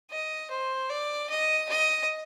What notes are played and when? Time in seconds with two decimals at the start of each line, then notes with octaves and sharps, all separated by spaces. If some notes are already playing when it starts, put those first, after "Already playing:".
0.10 D#5
0.50 C5
0.90 D5
1.30 D#5
1.69 D#5